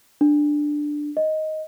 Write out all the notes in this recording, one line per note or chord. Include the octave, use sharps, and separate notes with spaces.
D4
D#5